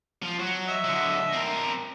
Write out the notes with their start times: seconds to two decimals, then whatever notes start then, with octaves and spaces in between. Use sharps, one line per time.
0.23 F3
0.39 F#3 C#6
0.67 D#5 E5
0.84 D3 F#3
1.33 C4 A#4